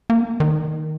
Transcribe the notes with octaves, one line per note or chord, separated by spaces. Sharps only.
A#3
D#3